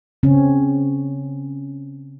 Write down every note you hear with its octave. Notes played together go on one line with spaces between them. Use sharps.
C#3 C4 C#4